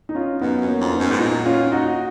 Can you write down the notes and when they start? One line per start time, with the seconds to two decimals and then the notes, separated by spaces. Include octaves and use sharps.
0.09 D#4
0.15 C#4 F4
0.41 F#2 B3 D#4
0.61 F#2
0.67 A#3 C#4
0.81 F2
0.94 B3 D#4
1.00 F#2
1.11 G#2
1.19 A#2 D#4 F#4
1.46 C#4 F4
1.72 D#4 F#4